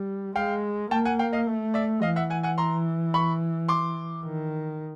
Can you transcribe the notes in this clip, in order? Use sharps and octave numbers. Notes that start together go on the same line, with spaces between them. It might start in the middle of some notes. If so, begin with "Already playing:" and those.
Already playing: G3
G#3 F5 G5
A#3 G5 A5
F#5 G#5
F5 G5
D#5 F5
A3
D5 E5
E3 D#5 F5
E5 F#5
F#5 G#5
F#5 G#5
A#5 C6
B5 C#6
C6 D6
D#3